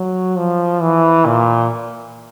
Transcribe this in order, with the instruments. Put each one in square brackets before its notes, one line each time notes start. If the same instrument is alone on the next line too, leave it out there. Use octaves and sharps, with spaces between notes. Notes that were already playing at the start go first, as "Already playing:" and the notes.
Already playing: [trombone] F#3
F3
E3
A#2